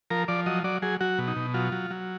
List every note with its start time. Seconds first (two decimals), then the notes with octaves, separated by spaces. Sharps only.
0.11 F3 A#4
0.28 F3 D5
0.46 F#3 D#5
0.64 F#3 D5
0.82 F#3 G#4
1.01 F#3 F#4
1.18 B2
1.27 D#4
1.37 B2
1.54 F#3 F4
1.72 F#3
1.91 F#3